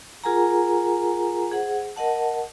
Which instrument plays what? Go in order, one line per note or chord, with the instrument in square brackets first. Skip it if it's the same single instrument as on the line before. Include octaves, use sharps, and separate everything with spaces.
[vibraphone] F4 G#4 A#4 F#5 G#5 A#5
G#4 C5 F#5
A#4 D#5 F#5 A5